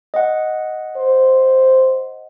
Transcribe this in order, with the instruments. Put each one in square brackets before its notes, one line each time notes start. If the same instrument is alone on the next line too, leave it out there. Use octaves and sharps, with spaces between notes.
[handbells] D#5 F#5
[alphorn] C5